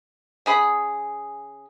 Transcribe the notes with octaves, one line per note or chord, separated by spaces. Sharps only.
C#3 G#4 B5